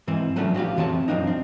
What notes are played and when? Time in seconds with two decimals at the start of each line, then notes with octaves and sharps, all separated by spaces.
0.07 G#2 E3 C4 E4
0.36 F3 F#3 A3 B3 C#4 D4
0.54 A2 F#4 G4 F5
0.77 F2 E3 F3 C4 C#5 A5
1.08 F#2 F3 C4 D4 D#4
1.27 C4